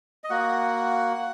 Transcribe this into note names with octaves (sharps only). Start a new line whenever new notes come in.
D#5
A#3 F#4 F#5